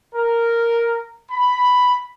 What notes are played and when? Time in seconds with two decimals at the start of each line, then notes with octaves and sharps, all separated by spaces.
0.13 A#4
1.30 B5